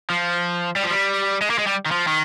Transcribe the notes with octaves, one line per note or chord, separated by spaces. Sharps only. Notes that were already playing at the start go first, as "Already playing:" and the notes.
F3
G3
F3
G3
G#3
A#3
G#3
G3
D#3
F3
D#3